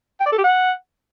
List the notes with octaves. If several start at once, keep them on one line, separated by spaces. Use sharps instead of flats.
G5
D5
A4
G4
F#5